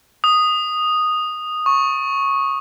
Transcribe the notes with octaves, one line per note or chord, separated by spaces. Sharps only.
D#6
C#6